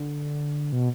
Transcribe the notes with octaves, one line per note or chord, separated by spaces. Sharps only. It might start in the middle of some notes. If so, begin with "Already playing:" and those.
Already playing: D3
B2